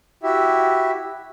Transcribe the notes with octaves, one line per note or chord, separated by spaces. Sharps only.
E4 F#4 G4 E5